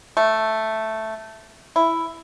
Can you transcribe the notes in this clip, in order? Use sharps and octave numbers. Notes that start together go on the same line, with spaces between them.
A3
E4